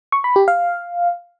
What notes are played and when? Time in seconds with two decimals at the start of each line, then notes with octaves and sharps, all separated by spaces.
0.12 C#6
0.24 B5
0.36 G4
0.48 F5